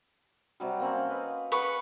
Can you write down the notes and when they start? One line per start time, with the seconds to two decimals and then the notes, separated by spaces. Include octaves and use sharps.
0.60 C3 F#3 G3
0.80 A#3 C4 C#4
1.09 B4 D#5 F5
1.52 G#4 B4 F#5 C#6